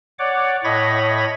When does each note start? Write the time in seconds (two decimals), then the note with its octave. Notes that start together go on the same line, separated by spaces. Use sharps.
0.19 C#5 D5 F#5 D6
0.64 A2 C#5 D#5 B5 G#6 A#6